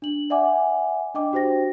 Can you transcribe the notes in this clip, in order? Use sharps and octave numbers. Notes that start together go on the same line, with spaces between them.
D4 F#7
D5 E5 F#5 G#5 D6
D4 D#5 G5 D6
D4 F#4 G4 C5 G5 A#6